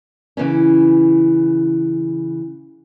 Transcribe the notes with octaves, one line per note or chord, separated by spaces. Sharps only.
C#3 E3 B3 C#4